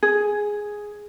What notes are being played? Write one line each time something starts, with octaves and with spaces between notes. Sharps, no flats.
G#4